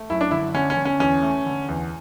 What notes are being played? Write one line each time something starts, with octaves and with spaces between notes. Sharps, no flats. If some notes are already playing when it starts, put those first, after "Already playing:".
Already playing: A3
F#2 E4
D4
D3 E4
D3 C#4
C#4
D3
C#4
E2 C#4
A3
D3
E2